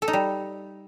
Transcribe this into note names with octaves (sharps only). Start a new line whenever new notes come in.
A4
D#4
G3